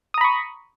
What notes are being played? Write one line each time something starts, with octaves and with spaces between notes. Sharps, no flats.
A#5 B5 C#6 D#6